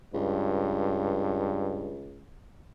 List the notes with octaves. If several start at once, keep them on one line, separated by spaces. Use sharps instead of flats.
C#2 G2